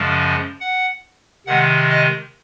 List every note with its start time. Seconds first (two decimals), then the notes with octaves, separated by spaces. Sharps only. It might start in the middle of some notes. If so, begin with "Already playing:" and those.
Already playing: F#2 C#3 F3 G#3
0.61 F#5
1.47 C3 D#3 G#3 F#5
1.90 D#5